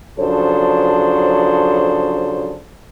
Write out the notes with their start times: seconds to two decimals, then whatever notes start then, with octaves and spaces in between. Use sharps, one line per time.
0.19 C#3 F3 F#3 D4 A4 C5